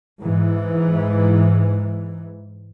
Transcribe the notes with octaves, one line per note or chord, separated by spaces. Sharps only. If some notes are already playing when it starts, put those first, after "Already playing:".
G#2 E3